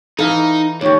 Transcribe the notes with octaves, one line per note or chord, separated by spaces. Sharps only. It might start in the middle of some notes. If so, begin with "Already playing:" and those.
E3 D#4 A4 F5
D#2 G4 C#5 D5